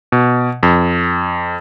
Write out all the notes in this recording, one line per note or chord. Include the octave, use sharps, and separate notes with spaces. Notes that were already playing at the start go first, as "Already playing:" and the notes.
B2
F2